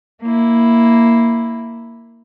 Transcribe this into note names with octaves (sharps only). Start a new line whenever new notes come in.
A#3 E4